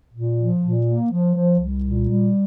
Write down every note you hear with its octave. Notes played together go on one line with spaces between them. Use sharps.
A#2
F3
A#2
A#3
F3
F3
C2
A#2
G3